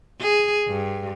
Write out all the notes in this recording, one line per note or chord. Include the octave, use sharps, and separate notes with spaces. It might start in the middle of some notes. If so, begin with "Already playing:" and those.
G#4
G2